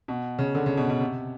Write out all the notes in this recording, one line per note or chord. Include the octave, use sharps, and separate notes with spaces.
B2
C#3
D3
C#3
B2
B2
C3